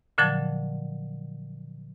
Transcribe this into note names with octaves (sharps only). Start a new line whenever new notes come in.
A#2 D3 F3 F#3 A5